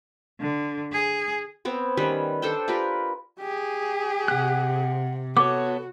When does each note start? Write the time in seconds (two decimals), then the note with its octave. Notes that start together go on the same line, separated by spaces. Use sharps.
0.40 D3
0.92 G#4
1.65 B3 C4 C#5
1.97 D#3 G3 C#4 B4
2.42 D4 A4 C5 G5
2.68 F4 G4 A#4 B4
3.40 G4 G#4
4.28 C3 F#5 F#6
5.37 B3 F#4 A4 C#5 D6